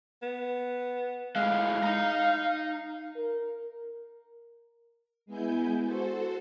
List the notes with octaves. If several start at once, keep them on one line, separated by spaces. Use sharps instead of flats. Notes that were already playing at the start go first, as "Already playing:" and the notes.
B3
A2 G#3 F5
D#4 A#5
A#4
G#3 B3 E4 G#5 G6
F#4 A4 C5